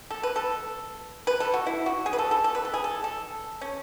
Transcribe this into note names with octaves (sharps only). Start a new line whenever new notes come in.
A4
B4
A4
B4
A4
F#4
E4
F#4
G#4
B4
A4
A4
A4
B4
A4
G#4
A4
A4
C#4